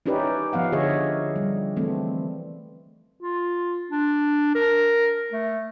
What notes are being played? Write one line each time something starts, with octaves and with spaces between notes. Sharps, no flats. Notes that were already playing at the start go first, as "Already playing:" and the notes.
C#4 D#4 E4 G4 B4 D5
F3 B3 F5 F#5
D3 G#4 C#5 D#5 E5
G3
E3 A3 C4
F4
D4
A#4
A3